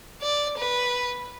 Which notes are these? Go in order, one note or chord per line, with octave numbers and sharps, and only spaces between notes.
D5
B4